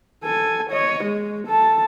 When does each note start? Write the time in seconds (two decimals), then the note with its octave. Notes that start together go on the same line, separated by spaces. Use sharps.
0.24 A4 G#5
0.71 C#5 D#5
1.05 G#3
1.48 A4 A5